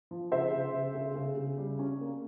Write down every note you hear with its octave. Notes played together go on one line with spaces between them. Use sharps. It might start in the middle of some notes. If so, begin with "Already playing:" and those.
F3
C#3 C5 E5
C#3
C#3
C#3
C#3
C#3
G3
C#4
A#3